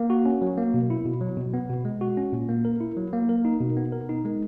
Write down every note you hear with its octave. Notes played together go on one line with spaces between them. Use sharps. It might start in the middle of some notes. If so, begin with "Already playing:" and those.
Already playing: A#3
F#4
C#4
F#3
A#3
B2
E4
B2
F#3
B2
B3
B2
G#3
F#4
C#4
A#2
A#3
A#4
E4
F#3
A#3
A#4
D#4
B2
B3
A#4
D#4
G#3